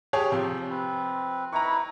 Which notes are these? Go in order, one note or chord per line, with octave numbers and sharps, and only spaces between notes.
G4 G#4 C#5
C3 F3 G5
C4 B4
D#4 E4 B4 A#5 C#6